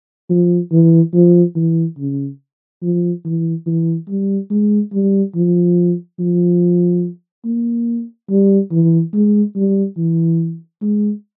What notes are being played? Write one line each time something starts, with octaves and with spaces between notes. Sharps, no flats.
F3
E3
F3
E3
C#3
F3
E3
E3
G3
G#3
G3
F3
F3
A#3
G3
E3
G#3
G3
E3
G#3